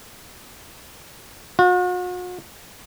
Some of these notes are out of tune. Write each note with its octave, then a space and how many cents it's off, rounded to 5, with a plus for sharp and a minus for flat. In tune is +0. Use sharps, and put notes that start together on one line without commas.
F#4 -45